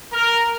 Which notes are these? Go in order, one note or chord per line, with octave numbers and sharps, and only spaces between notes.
A#4